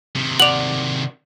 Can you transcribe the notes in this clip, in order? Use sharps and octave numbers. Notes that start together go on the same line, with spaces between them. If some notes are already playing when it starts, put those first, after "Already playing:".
C3 D#3
D5 F#5 F7 F#7